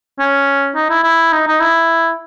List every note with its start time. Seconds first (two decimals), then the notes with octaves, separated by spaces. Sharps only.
0.19 C#4
0.75 D#4
0.89 E4
1.04 E4
1.32 D#4
1.47 D#4
1.60 E4